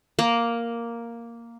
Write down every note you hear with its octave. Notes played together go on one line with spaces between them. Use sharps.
A#3